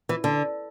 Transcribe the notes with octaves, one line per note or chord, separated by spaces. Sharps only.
E3
D3